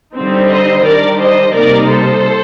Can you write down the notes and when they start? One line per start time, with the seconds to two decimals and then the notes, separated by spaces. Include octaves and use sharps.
0.15 D3 G3 C4 D#4
0.50 C5 D#5
0.85 D#3 G3 D4 A#4 D5
1.20 C5 D#5
1.55 C3 G3 A#3 D#4 A#4 D5
1.89 A4 C5